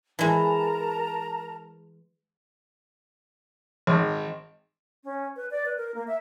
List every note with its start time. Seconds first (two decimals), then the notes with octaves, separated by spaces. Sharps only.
0.19 E3 G#3 A#4 A5 A#5
3.87 G#1
5.04 C#4
5.36 B4
5.51 D5
5.65 B4
5.77 A#4
5.95 A#3
6.07 E5